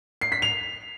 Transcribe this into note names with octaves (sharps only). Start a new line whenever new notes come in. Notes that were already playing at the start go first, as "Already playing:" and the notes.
C7
B6
F7